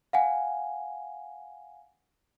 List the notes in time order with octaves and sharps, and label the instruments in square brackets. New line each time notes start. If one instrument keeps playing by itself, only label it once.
[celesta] F5 F#5 G#5